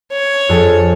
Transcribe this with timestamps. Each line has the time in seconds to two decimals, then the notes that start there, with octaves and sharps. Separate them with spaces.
0.12 C#5
0.49 F2 G#4 A4